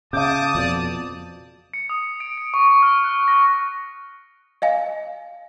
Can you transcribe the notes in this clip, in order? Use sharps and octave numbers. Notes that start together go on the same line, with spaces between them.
C#3 F5 A5 D6 D#6 G6
F2 B2 D5
C#7
D#6
D7
D7
C#6
F6
F#6
A#6
D#5 F5 G#5